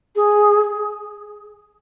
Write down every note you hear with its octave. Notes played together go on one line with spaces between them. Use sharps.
G#4